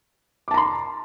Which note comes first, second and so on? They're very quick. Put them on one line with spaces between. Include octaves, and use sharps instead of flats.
D6 A5 A#5 C6